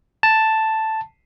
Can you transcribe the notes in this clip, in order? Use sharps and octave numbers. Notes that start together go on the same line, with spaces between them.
A5